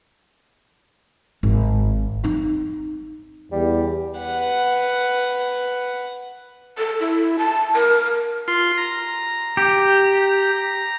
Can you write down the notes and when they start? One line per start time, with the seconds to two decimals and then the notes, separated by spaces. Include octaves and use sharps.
1.43 G#1
2.24 C4 D#4
3.52 E2 G3
4.19 B4 F#5
6.78 A4
7.00 E4
7.39 A5
7.75 A#4
8.48 F4 C6
8.78 A#5
9.57 G4